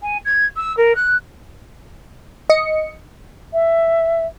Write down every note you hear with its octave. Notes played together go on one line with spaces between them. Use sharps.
G#5
G#6
E6
A#4
F#6
D#5 C#7
E5